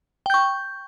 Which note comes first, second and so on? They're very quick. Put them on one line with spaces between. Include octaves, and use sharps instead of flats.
G5 G6 C#6